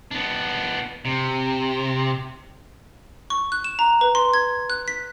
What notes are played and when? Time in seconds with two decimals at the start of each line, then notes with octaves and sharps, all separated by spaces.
0.11 B3 D4
1.05 C3
3.30 C#6
3.52 F#6
3.64 E7
3.79 A#5
4.01 B4
4.15 C6
4.34 G#6
4.70 F#6
4.88 B6